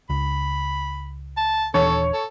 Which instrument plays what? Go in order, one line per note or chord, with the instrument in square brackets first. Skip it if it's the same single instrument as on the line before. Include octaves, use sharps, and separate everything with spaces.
[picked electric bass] C#2 [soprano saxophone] B5
[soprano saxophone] A5
[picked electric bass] D#1 E3 D4 [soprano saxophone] A4 [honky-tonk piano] C#5
[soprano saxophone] A4